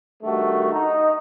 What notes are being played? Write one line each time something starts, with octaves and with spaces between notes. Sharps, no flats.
G2 D#3 A3 F#4
D#4